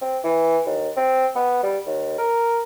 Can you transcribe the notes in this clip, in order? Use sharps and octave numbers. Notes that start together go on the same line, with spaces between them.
C4
E3
D#2
C4
B3
G3
D#2
A#4